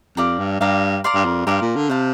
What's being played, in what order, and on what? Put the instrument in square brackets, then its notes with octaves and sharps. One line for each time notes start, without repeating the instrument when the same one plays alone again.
[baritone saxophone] F2 [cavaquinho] G4 D5 F5 A#5
[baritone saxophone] G2
[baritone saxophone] G2 [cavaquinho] G4 D5 F5 A#5
[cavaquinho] A#4 D5 F5 C6
[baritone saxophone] G2
F2
[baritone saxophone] G2 [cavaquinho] A#4 D5 F5 C6
[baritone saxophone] A#2
D3
[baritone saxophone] C3 [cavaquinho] C5 F5 A5